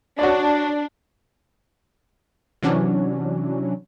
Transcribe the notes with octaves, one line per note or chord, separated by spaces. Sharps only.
D4 F#4 C#5 D5
C3 E3 F#3 C#4 D4